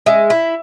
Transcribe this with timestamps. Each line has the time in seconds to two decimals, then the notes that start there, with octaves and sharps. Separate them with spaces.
0.06 G#3 E5
0.30 E4